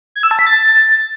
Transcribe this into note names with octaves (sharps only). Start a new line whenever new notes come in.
G#6
E6
A5
B6
A6